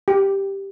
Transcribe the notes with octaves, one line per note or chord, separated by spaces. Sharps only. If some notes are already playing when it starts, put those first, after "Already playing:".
G4